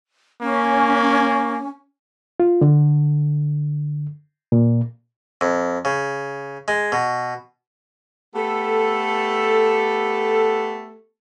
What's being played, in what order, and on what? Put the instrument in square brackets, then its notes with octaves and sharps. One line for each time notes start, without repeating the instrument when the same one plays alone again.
[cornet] A#3 [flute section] C#4
[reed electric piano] F4
D3
A#2
[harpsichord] F2
C#3
G#3
B2
[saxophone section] A3 B3 G4 A4